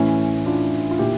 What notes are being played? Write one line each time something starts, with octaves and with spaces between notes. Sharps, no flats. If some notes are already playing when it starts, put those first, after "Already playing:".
Already playing: A2 E3 C#4 E4
D4 F4
F4
A#2 E4 G4